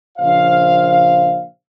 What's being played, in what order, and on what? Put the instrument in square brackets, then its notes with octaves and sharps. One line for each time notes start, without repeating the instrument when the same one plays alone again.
[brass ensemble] A#1 C#3 C5 F5